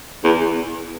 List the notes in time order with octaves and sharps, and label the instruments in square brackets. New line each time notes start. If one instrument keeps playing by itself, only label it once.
[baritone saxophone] E2